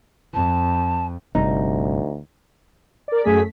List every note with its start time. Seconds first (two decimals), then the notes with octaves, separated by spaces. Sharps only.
0.34 F2 A5
1.35 G1 D2 C3 G3 D#4
3.08 A#4 D5
3.24 F#2 A3 G#4 B6